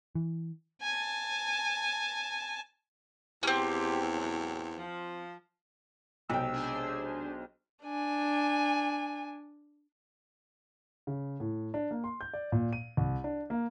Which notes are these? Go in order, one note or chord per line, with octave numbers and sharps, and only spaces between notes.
E3
G#5 A5
E2 C4 C#4 G4
A2 C3 F#3
F3
B1 C3 G#3 G5 E6
D4 G#4 C5
D4 G#5
C#3
A2
D4
A#3
C6
G6
D5
A#2
D#7
C2
D4
A#3